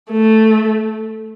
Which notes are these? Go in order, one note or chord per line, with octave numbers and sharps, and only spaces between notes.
A3